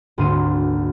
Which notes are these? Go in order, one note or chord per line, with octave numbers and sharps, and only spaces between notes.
G#1 D2 A#3 C6 D#7